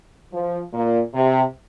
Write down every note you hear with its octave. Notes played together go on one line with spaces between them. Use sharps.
F3
A#2
C3